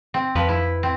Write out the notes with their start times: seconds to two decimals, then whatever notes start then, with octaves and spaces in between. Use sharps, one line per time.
0.14 C4
0.35 F2 F3 B4
0.49 E4
0.83 C4